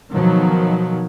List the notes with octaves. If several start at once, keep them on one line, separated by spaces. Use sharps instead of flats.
B2 D#3 F3 F#3